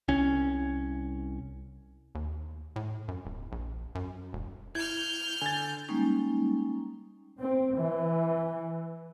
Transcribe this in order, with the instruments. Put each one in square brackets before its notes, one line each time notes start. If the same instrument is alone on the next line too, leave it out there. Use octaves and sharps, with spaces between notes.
[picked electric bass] C2 C#4
[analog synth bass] D#2
A2
F#2
D1
A#1
F#2
E1
[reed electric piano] E4 [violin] F6 G6 [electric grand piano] G#6
[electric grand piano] D3 A6 [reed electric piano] G#5
[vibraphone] G3 G#3 A#3 C#4 D#4
[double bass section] C4
E3